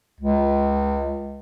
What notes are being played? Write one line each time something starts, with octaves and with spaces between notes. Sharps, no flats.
C#2